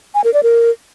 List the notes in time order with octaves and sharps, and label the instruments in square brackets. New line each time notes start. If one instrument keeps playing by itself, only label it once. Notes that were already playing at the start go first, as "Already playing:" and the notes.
[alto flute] G#5
A#4
D5
A#4